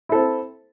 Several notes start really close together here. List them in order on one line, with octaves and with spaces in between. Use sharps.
E4 A4 C4